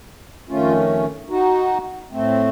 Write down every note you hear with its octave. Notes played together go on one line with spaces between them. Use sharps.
F2 D#3 A3 C#4 F4
D#4 F#4
A2 A3 C4